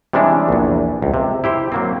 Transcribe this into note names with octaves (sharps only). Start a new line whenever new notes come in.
C3 E3 G3 G#3 C#4 D4
A#1 E2
C#2
C3
E4 G4 C5
F#3 A#3 C4